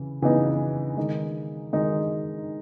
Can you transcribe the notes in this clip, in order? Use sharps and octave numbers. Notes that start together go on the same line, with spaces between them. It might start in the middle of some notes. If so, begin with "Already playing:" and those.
Already playing: C#3 E3
C#3 E3 B3 D#4
D#3 G#3 D#4
D#3 G#3 D#4